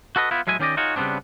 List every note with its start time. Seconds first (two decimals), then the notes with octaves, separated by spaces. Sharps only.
0.16 F#4 A4 B4 D#5
0.31 B3 E4 F4
0.47 A2 F#3 G#3 E5 G#5
0.59 D#3 C#4 G4 D5 D#5
0.77 D#4 F4 F#4 G#4 C#5
0.96 C#3 G3 B3 C4 D4